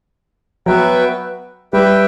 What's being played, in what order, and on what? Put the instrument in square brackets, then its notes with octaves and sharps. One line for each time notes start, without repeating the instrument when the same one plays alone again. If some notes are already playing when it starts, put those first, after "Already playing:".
[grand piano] F#3 [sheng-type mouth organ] B3 F#4 B4 E5 G5
[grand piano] G3 [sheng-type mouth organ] G4 B4 E5 G5